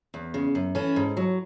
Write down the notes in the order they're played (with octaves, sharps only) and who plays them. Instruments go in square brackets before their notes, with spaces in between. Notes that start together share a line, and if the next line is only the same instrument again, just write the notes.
[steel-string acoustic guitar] E2
C#3
F#2
E3 A3 C#4
G#2
F#3